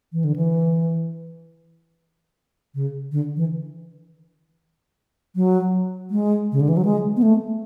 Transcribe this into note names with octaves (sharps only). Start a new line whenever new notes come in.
E3
D3
E3
C#3
D3
E3
F#3
G#3
C#3
D3
E3
F#3
G#3
B3
A3